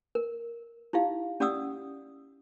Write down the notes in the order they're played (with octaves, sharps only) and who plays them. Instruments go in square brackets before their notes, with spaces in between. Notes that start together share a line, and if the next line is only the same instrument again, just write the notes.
[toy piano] A#4
D#4 E4 G4 F5
C#4 G4 D5 F#5 D#6 E6